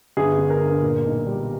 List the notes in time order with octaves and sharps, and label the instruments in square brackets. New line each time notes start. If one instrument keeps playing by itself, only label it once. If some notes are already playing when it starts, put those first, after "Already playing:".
[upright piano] G1 G#4
G1
A#4
G2
A#2
B1
G3